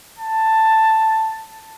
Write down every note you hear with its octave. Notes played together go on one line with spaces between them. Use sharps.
A5